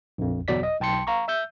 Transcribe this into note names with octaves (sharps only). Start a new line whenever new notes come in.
A#1 F2
G1 E2 B2 F#3 D5 B6
D#5
B1 G5 A5 C6 C#7
F5 A#5 C#6
E5 E6 G6